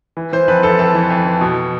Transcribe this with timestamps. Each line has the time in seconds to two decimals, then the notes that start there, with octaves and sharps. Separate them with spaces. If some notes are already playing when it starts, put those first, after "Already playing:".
0.17 E3
0.33 E3 C5
0.48 F2 B4
0.63 F2 A4
0.79 F2 A4
0.94 E3
1.10 F2
1.26 E3
1.41 B2